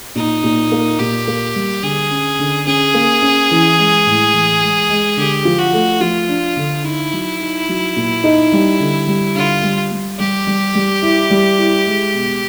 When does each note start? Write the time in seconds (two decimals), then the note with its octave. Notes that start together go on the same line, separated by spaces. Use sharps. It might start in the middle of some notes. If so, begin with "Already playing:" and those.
0.15 A#2 D#4
0.44 A#2
0.72 A#3
0.99 A#2 G4
1.27 A#3
1.55 G3
1.83 D3 G#4
2.11 C#4
2.39 D3
2.66 C#4 G#4
2.94 A#3
3.22 C#4
3.51 E3
3.78 G#3
4.06 A2
4.33 E3
4.61 G#3
4.90 G#3
5.17 D3 G4
5.45 F3
5.59 F#4
5.73 A3
6.00 F3 F4
6.29 D4
6.57 D3
6.84 D#4 E4
7.12 F#3
7.40 D#4
7.68 F#3
7.96 A#2
8.24 D#4
8.52 G3
8.80 D3
9.07 G3
9.35 D3 F4
9.63 G3
9.91 G3
10.19 G3 G4
10.47 G3
10.75 G3
11.02 E4
11.30 G3
11.58 E4
11.86 G#3
12.14 B2